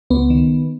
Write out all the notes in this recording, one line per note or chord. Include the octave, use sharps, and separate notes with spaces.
C#2 B3
D#3